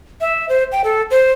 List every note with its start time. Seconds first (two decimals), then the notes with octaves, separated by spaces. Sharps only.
0.21 E5
0.49 C5
0.72 G5
0.84 A4
1.11 C5